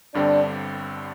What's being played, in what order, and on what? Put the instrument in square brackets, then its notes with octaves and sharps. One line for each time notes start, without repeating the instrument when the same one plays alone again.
[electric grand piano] G1 G2 D3 G3 C4 [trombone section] D4